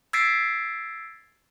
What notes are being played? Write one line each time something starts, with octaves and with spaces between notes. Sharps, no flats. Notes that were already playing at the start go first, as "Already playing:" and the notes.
E6 G#6 A6 B6 C7 D7